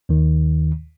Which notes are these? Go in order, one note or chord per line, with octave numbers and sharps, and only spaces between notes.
D#2 D#3